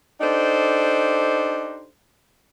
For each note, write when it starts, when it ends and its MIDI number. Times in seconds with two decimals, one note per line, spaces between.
0.21 1.88 62
0.21 1.88 63
0.21 1.88 67
0.21 1.88 69
0.21 1.88 72